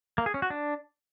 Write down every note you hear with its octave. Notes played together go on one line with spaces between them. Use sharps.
A#3
G#4
C#4
F#4
D4